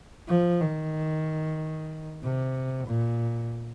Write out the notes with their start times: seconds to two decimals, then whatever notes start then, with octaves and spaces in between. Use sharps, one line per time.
0.28 F3
0.60 D#3
2.22 C3
2.87 A#2